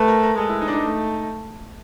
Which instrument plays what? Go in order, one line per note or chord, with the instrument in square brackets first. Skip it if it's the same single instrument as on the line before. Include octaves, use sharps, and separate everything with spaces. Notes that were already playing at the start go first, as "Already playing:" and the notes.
Already playing: [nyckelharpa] A3 [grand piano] B4
[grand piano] A#4
A#4
[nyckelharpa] G#3 [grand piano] A4
[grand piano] E4
D#4
D4
D#4
[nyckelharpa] A3